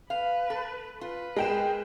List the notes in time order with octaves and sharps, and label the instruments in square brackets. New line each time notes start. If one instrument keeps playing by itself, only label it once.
[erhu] B4 [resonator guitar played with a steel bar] F5
[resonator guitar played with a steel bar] A4
[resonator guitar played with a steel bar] F4 [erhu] B4
[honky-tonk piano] G#3 G5 E7 [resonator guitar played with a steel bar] A#4